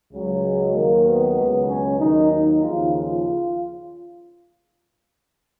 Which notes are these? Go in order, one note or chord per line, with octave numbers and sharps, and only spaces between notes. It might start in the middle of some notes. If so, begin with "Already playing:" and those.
C#2 C#3 F#3
G#3
D#2 D#3 F#3 A#3
B3
C#2 B2 F#3
C#4
D#2 D#3 F#3 D#4
D#4
D#2 C#3 F3 F4
F4